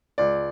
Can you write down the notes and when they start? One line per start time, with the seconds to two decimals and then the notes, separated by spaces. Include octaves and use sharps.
0.18 C#2 D5